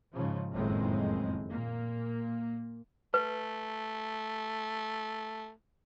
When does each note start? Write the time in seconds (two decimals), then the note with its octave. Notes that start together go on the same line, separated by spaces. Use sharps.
0.13 G#2 C#3 F3
0.52 F#1 F2 A2 D#3 G#3 C4
1.50 A#2 A#3
3.14 A3 B4